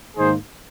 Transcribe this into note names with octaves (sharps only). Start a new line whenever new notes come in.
G#2 D#3 A#3 D#4 G#4 C5